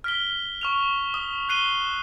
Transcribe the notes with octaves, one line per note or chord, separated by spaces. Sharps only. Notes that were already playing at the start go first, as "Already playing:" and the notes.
F6 B6 G7
C#6 F6 F7
D#6
F#6 C7 D#7 G7